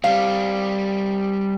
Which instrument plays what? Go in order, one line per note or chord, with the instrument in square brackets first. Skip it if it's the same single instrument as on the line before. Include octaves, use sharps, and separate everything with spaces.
[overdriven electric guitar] G3 C4 [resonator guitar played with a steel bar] F5